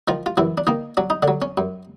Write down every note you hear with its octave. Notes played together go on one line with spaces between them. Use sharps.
D#3 F3 F4
F4
F#2 E3 E4
D4
D#3 A#3 D#4
F#3 D4
D#4
D3 D4
F#3
C#4
F#2